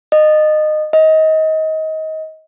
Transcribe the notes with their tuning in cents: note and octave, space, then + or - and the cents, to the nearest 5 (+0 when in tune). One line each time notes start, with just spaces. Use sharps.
D#5 -20
D#5 +25